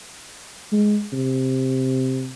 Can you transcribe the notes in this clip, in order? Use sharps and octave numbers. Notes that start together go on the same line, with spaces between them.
G#3
C3